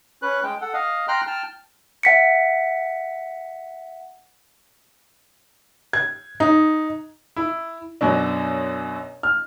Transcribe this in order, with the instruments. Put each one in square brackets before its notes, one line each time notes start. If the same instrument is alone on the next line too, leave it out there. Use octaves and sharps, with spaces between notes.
[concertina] C#4 B4 F#6
G#3 G5
A4 F#5
D#5 F5
G5 A#5 C6 F6 F#6
G5 A5 F6
[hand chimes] E5 F#5 B6 C#7
[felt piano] G#6
D#4
[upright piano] E4
F#2 B2 F#3 D4
F6